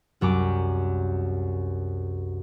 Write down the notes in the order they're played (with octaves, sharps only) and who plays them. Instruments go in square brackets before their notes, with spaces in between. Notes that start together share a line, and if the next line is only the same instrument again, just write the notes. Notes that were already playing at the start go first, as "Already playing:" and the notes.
[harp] C2 F#2 A#5 D6